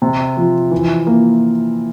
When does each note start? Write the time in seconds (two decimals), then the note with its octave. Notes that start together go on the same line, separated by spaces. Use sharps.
0.02 C3
0.37 F3
0.71 E3
1.07 A#3